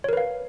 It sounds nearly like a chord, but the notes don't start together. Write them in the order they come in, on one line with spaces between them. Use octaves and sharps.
C#5 A#4 B4 F5